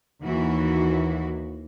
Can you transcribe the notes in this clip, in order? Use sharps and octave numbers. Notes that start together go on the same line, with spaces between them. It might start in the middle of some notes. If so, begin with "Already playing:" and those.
D#2 E3 F#4